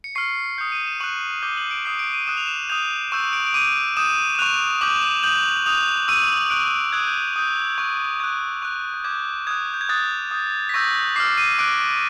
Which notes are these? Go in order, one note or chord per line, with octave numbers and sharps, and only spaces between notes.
C#7
C#6 F6 C7
D#6 G6 C#7
D#7
E7
C#6 F#6 F#7
D6 G6 G7
F#7
D7
D#6 G6 C7
D7
D#7
D#6 F#6 E7
F7
E7
D#6 G6 F7
C#6 E6 G6 E7
D7
D7
D6 G6 D#7
D#6 G6 E7
E7
C#6 F#6 F7
D6 G6 F#7
F#7
D#6 G6 F#7
D#6 G6 F7
C#6 E6 G6 D#7
C#6 F#6 D7
D#7
D7
D#6 F#6 G#6
G6
G6
D#6 G6
C#6 F#6
C#6 F#6 G#6
C#6 F#6
G6
D6 G6 G#6
D#6 F#6 G#6
G6
G#6
D#6 F#6 A6
D#6 G6
B6
C#6 E6 G6 A#6
D6 F6 C7
D#7
D6 F#6 D7